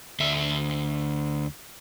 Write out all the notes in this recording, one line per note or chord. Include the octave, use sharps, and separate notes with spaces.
D2 E5